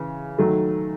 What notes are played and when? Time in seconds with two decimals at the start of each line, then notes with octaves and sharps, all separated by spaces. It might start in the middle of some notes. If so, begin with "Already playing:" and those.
Already playing: C#3 E3
0.38 D#3 F#3 A3